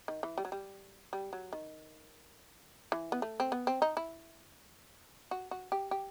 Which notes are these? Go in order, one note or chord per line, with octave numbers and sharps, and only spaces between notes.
D#3
E3
G3
F#3
G3
G3
F#3
D#3
E3
B3
A3
C4
B3
C4
D#4
E4
F#4
F#4
G4
G4